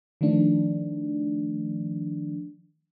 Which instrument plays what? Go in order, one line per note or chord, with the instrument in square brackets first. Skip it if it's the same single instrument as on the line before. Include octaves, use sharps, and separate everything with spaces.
[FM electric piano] D#3 F3 A3 D4